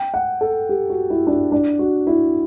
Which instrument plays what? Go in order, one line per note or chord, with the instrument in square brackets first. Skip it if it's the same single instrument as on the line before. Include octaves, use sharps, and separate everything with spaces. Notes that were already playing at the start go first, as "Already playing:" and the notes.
Already playing: [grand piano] G5
F#5
A4
G4
F#4
E4
D4
E4
D4
F#4
E4